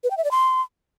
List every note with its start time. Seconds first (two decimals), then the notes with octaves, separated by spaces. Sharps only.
0.04 B4
0.11 G5
0.17 E5
0.24 D5
0.31 C6